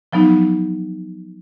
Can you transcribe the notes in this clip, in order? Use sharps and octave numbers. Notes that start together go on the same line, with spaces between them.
F3 F#3 B3 D#4